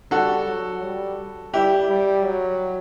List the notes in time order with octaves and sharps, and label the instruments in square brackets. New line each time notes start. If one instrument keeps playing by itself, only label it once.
[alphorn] G3 [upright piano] F#4 A4
[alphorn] F#3
G3
[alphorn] G3 [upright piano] E4 G4
[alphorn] G3
F#3